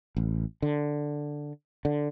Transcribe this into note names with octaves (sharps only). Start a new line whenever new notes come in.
A1
D3
D3